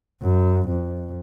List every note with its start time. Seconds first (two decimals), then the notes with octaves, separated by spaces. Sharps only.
0.22 F#2
0.69 F2